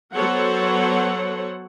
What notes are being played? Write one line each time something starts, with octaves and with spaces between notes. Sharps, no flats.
F#3 B3 A4 C5 C#5 F#5